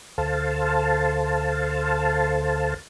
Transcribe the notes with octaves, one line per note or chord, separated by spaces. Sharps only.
D2 A4 C5 F5 A5